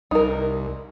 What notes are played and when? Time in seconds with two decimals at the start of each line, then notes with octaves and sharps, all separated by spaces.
0.11 C2 D#4 A#4